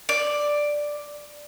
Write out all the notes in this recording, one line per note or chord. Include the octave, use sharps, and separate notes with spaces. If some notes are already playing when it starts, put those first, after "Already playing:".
D5